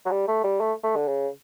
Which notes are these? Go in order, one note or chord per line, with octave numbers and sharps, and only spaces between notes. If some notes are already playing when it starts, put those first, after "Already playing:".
F#3
G3
A3
G3
A3
A3
D3
C#3